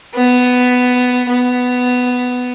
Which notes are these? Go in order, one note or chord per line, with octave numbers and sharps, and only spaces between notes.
B3
B3